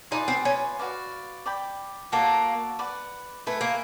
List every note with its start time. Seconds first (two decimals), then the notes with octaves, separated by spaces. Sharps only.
0.11 D#4 F4 G#4 B4 D5
0.28 C4
0.45 C#4
0.79 F#4 B4 D5 F5
1.46 D5 G5 B5
2.12 A#3 F#4 A4 D5 F#5
2.79 B4 D5 F#5
3.46 A3 B4 E5 G#5
3.61 A#3